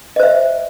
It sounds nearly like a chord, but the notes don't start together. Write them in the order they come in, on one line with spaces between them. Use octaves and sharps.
D#5 C5 E5